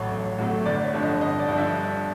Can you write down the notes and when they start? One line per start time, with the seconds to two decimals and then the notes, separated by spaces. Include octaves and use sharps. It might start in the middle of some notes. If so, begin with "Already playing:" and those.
Already playing: A1 A2 F#3 A3 C#5
0.11 A1
0.39 A2 F#3 A3
0.66 G1 D5
0.85 C#5
0.94 G2 D3 F3
1.03 D#5
1.21 G1 D#5
1.39 D5
1.49 G2 D3 F3
1.57 E5